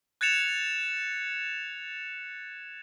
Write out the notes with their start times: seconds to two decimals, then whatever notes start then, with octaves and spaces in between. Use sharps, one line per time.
0.21 F#6 G#6 A6 C#7 E7 F7